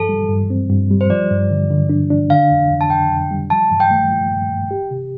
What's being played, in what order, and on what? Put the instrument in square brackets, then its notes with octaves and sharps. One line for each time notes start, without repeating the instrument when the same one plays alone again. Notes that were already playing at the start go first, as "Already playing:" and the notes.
Already playing: [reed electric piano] G2 F3 [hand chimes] A4
[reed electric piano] G3
G2
C4
G2
G3
[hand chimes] C5
[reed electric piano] F3 [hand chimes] D5
[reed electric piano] G2
D3
D3
D4
D4
[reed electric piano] D3 [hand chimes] F5
[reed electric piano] F2
F2
[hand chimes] A5
[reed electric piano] F2 [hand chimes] G5
[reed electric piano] F2
G3
[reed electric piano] F3 [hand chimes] A5
[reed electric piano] G2
[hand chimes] G5
[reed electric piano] A3
F3
G2
G2
G4
C3